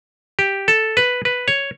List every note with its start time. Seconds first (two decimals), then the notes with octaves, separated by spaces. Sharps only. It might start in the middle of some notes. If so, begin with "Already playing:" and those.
0.39 G4
0.68 A4
0.97 B4
1.25 B4
1.48 C#5